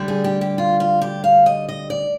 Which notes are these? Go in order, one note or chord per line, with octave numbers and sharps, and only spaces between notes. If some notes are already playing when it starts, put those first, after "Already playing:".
Already playing: D2 D3 G3
G#4
G4
G4
F4
F4
G4
F5
D#5
D#5
D5